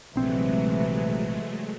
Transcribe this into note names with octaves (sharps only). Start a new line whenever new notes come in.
A#1 C3 E3 F#3 G#3 A3 C4